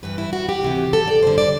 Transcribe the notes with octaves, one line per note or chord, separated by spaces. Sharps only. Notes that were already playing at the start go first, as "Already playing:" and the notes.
G2 E3 B4
E4
F#4
G4
D2 C3 E3
A4
D5
G2 D3 C5
D5